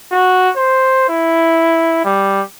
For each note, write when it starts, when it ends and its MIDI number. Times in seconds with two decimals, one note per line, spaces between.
0.12 0.50 66
0.56 1.07 72
1.09 2.03 64
2.05 2.42 55